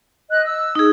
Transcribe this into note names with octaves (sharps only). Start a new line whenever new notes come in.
D#5 F#6
E6
D#4 G#4